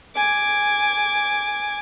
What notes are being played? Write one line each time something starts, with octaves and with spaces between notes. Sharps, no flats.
G#5 D6